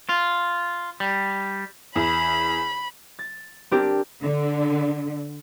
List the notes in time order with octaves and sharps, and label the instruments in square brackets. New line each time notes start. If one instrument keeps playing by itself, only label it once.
[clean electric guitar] F4
G3
[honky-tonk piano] E2 [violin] B5
[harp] A6
C4 D4 G4 A#4
[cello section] D3